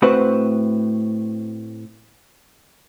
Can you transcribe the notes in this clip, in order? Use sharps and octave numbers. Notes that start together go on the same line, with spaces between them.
A2 C4 F#4 B4 C5 F#5